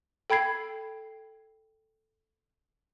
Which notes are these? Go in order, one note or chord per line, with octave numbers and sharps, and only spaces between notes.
A4 G5 B5 G#6 C7